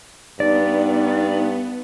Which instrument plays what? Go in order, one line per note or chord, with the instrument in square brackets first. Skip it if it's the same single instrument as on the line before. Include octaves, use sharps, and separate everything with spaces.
[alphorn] G2 [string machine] B3 [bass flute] D#4 [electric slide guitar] D5